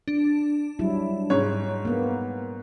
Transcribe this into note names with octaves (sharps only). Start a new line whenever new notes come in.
D4
F#3 G3 E4
G#2 C#5
A#3 B3